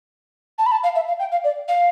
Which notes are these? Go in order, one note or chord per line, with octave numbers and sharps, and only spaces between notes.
A5
B5
A5
F5
E5
F5
G5
F5
D5
F5